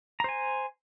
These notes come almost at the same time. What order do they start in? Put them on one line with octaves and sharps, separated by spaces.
A#5 C5 G#5